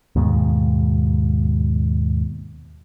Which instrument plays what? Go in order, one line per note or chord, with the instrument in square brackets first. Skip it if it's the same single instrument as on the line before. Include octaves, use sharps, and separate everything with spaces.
[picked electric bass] D#2 G#2 B2